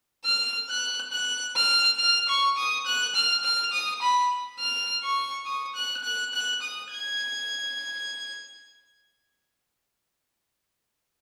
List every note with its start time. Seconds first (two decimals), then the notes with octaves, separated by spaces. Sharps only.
0.25 F6
0.69 F#6
1.12 F#6
1.56 F6
1.99 F6
2.28 C#6
2.57 D#6
2.86 F#6
3.15 F6
3.44 F6
3.73 D#6
4.02 B5
4.60 F6
5.03 C#6
5.46 D#6
5.75 F#6
6.04 F#6
6.33 F#6
6.62 D#6
6.91 G#6